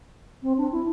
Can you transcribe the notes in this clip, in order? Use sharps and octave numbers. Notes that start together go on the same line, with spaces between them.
C4
D4
E4